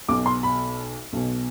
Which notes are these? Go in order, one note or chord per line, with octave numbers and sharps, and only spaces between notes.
B1 B2 D6
C6
B5
B1 B2